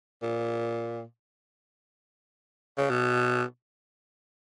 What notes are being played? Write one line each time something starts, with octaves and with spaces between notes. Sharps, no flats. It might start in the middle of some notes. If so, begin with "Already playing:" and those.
A#2
C#3
B2